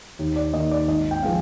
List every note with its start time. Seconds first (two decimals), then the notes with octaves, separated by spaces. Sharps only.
0.19 D#2
0.36 D5
0.53 D#3 A#3 D#5
0.71 D5
0.88 G#1 D#5
1.11 G5
1.22 F3 G#3 C4 F5